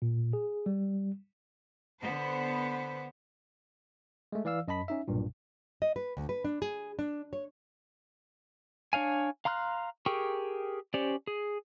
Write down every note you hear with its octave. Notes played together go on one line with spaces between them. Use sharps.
A#2
G#4
G3
D3 B3 C5
G#3 A3
E3 D5 F5 E6
F#2 D#5 A5 B5 B6
C#4 D#4 E5
B1 G2 A#2
D#5
B4
D2
B4
D4
G#4
D4
C#5
D4 C#5 F5 G#5
F5 A#5 C6 F6 F#6
G4 G#4 A#4 G5 C#6
C#4 G4 C5 D5
G#4